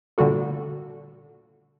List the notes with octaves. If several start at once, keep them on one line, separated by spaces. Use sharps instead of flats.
A#2 D3 G3 A3 F#4 A4